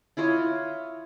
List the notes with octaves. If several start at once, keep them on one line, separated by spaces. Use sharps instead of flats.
E4 F4 C#5 D#5